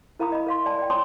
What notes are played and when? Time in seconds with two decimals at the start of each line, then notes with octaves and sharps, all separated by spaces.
0.19 E4 A#4 F5 A#5 B5 D#6
0.32 D#5 B5
0.47 A#4 F5 C6
0.66 D5 G#5 A5
0.79 D5 G5
0.90 C#5 G#5 A5 C6 D#6